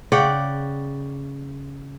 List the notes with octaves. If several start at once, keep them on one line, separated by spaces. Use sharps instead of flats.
C#3 D5 F#5 G5